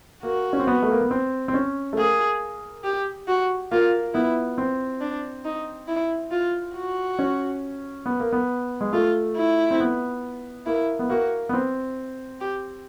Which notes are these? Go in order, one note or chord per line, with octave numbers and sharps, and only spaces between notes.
A#3 F#4
C#4
C4
B3
A3
A#3
B3
C4
C4
C#4
A3
A#3 G#4
G4
F#4
A#3 F4
B3 E4
C4
D4
D#4
E4
F4
F#4
C#4
B3
A#3
B3
G#3
A3 F4
E4
C4
B3
A#3 E4
B3
A#3 F#4
B3
C4
G4